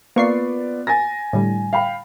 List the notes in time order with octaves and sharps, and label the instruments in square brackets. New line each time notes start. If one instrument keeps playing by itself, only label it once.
[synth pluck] A#3 C#6 C7 [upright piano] B3 F4 D5
[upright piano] G#5 A6 A#6
[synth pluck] A2 D3 G3
[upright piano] F5 G5 B5